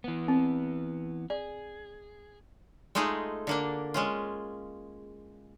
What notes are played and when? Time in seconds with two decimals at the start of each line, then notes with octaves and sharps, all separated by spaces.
0.04 E3 B3
0.28 C4
1.30 G#4 D5
2.95 G#3 A3 D#4 F4 G#4
3.47 D3 A#3 D4
3.94 G#3 C#4 F4